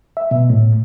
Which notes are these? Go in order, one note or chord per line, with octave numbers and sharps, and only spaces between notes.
E5
B2
A2